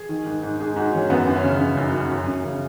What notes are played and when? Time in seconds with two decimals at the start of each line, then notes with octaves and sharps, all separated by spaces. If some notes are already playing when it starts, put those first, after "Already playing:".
Already playing: G#4
0.09 D#3
0.26 G#2
0.43 G#2
0.60 G#2 G#4
0.76 G#2 F#4
0.94 D#3 C#4
1.10 F#2 B3
1.28 F#2
1.36 C#4
1.44 C#3
1.61 C#3
1.77 F#2
1.94 F#2
2.12 F#2
2.27 F#2
2.45 C#3